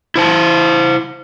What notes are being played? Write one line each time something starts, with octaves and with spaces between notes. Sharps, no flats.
E4 C5 A5